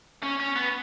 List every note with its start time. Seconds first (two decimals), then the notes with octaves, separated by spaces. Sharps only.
0.23 C#4
0.40 C#4
0.56 B3